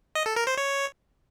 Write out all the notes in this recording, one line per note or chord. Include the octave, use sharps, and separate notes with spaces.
D#5
A4
A#4
C5
C#5